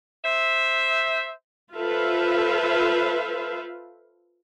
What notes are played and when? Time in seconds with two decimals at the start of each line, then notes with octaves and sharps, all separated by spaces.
0.25 C5 E5
1.74 F4 A4 B4 C5 E5 F5